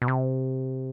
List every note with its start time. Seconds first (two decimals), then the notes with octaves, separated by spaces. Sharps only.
0.02 B2
0.08 C3